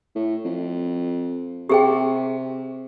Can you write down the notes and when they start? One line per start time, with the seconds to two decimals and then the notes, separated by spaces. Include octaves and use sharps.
0.15 A2
0.45 F2
1.69 C3 G4 G#4 G5